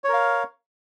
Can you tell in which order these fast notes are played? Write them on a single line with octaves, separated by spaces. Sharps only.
C#5 A#4 F5